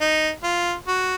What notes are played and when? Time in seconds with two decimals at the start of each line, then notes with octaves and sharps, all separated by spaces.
0.01 D#4
0.43 F4
0.87 F#4